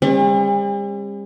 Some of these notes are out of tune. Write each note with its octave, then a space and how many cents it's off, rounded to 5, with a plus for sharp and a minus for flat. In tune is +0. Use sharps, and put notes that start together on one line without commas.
G3 +45 C#4 -45